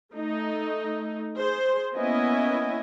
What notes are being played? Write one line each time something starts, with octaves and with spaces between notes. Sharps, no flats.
A3 D#4
G#4 C5
A#3 B3 C#4 E4 D#5 G#5